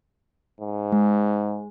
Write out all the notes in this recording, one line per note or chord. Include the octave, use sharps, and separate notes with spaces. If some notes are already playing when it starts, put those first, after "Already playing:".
G#2
G#3